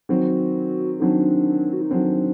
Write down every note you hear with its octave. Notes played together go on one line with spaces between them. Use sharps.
D#3 F#3 C4 F#4
D#3 F#3 C4 D4
F#4
D#4
D#3 F#3 C4 D4